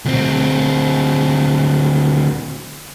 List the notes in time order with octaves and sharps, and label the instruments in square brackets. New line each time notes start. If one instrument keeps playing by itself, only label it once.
[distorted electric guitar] D2 C4